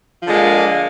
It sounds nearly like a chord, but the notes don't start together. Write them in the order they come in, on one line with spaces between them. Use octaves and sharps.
F3 D3 G#3 A#3